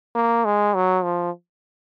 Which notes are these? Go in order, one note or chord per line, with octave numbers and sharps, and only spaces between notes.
A#3
G#3
F#3
F3